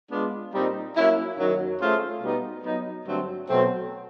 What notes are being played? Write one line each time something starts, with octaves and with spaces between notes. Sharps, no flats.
G#3 B3 D4 F4
A#2 G3 C4 D#4
F#3 A#3 C#4 E4
F#2 D#3 F#3
A3 C#4 F4 G#4 C5
B2 G3 B3 D#4
F#3 B3 D#4
G2 D3 F#3 A3 C4
B2 F#3 A3 C4